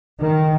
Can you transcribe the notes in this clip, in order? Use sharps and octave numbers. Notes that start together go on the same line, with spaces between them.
D#3